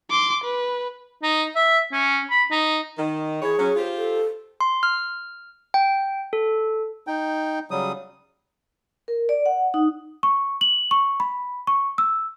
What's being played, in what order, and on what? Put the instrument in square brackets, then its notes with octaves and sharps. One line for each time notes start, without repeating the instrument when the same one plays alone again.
[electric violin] C6 D6
B4
[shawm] D#4
E5
C#4
B5
D#4
[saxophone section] D#3
[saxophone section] E3 C#5 [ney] G#4
[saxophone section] F#3 C#4
F4 G4 C5
[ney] A4
[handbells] C6
F6
G5
A4
[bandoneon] D#4 G5
C#3 F#3 G3 D#6
[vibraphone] A#4
D5
F#5
D#4
[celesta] C#6
F#7
C#6
B5
C#6
E6